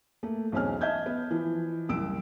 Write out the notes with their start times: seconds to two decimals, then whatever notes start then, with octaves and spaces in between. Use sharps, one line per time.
0.23 A3 A#3
0.52 B1 E2 C4 C#4 G#5 F6
0.81 D#5 E5 A5 G6 G#6
1.06 B3
1.31 E3 F3
1.89 F#1 C2 E6 D7